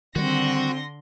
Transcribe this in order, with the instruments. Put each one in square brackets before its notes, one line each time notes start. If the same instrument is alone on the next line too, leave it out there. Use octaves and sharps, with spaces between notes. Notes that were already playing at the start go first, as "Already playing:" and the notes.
[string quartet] D3 C6 A#6 [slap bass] D#3 G3 [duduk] C4 [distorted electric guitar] F#4